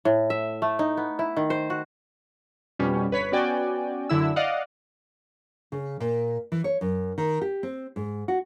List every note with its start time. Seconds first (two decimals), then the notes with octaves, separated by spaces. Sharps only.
0.05 A2
0.30 E5
0.62 A3
0.79 D#4
0.97 B3
1.19 E4
1.37 D#3
1.50 C5
1.70 F#4
2.79 F2 B2 G3 C#4
3.11 G1 B4 C#5 B6
3.32 B3 C#4 F#4 D5 G5 G#5
4.09 F#2 D3 E4 E6
4.36 D5 D#5 F5 F#5
5.72 C#3
6.00 A#2
6.52 E3
6.64 C#5
6.81 F#2
7.18 D#3
7.41 G4
7.63 C4
7.96 G#2
8.28 F#4